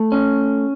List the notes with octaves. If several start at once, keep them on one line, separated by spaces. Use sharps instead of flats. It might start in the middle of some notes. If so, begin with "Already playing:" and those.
Already playing: A3
C#4